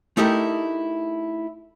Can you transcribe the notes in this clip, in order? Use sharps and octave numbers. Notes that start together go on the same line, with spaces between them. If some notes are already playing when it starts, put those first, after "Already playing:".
A3 D#4 E4 G4 A#4